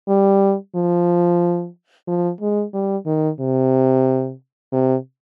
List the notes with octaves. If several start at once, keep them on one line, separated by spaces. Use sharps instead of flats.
G3
F3
F3
G#3
G3
D#3
C3
C3